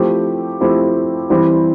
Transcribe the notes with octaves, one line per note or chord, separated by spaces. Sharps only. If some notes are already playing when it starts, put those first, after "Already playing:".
Already playing: F3 A3 C4 E4 G4
F3 A3 C4 E4 G4
E3 G3 C4 E4 G4